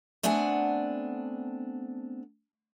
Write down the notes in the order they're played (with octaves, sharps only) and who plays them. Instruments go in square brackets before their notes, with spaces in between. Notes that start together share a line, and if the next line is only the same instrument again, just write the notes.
[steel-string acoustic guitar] A3 B3 C4 D4 F#5 G#5